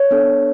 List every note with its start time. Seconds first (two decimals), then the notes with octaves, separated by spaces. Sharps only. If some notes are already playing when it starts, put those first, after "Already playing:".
Already playing: C#5
0.11 B3 D4 A4